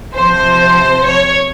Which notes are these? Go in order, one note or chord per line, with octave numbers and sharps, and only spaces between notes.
C3 F3 C5
C#5